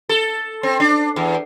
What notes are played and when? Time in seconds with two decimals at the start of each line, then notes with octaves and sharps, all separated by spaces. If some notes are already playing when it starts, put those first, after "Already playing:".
0.09 A4
0.63 C4
0.80 D4
1.16 E2